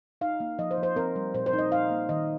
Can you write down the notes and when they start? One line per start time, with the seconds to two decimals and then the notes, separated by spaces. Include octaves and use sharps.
0.21 D#4 F5
0.40 A#3
0.59 F3 D#5
0.71 C5
0.78 F3
0.83 C5
0.96 C4 A#4
1.16 G3
1.34 A#2 C5
1.46 C5
1.53 D#4
1.58 D#5
1.72 D#4 F5
1.90 A#3
2.09 D#3 D#5